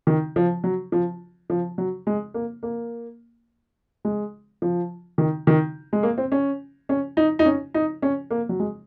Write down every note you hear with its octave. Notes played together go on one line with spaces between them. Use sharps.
D#3
F3
F#3
F3
F3
F#3
G#3
A#3
A#3
G#3
F3
D#3
D#3
G#3
A#3
C4
C#4
C#4
D#4
D#4
C#4
D#4
C#4
A#3
F#3
G#3